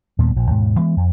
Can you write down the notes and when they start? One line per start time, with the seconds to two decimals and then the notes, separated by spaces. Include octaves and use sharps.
0.18 D#2 A#2 G3 B3
0.36 A#1 A#2
0.51 D#2 G#2 B2
0.78 E3 G#3 B3
0.97 F2